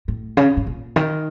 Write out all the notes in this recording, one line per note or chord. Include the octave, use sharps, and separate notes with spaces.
A2
C#3
A2
A#2
D#3